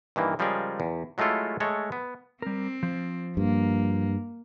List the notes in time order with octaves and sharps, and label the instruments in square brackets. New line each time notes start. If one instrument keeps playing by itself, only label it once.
[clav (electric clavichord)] G2 D#3 E3 A#3
C#3 F3 G3 G#3 G#4 A#4
E2
F#3 G#3 A3 E4 F4 A4
G#3 A3 A4 C#5
B3
[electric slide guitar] G3 A#4 [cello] C4
[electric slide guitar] F3
[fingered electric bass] G2 [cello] A#3